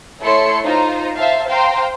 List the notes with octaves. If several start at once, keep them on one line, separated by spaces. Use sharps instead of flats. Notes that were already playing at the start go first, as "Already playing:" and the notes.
A3 E4 A4 C#5 C6 C#7
D#4 F4 C5 A#5
C5 E5 F5 A5
C5 F5 G5 A#5 C6